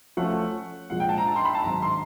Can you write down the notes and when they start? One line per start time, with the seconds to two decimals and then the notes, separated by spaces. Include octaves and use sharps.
0.17 F3 A3 C#4 F#5
0.90 A#2 F3 G#3 F#5
1.00 G5
1.09 A5
1.18 A#5
1.27 A5
1.36 C6
1.45 B5
1.54 A5
1.64 G#2 D#3 F#3 A#5
1.82 C6